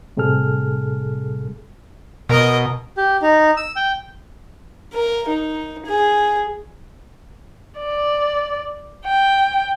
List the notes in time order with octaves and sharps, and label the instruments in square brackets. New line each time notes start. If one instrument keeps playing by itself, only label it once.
[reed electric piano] A2 C3 G3 G#4 A4 F6
[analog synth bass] B2 [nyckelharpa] A#4 D#5
[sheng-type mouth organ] G4
D#4
E6
G5
[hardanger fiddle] A#4
D#4
G#4
[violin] D5
G5